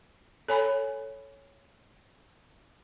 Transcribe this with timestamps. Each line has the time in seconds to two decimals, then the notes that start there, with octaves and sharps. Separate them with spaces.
0.48 A4 C#5 G#5 B5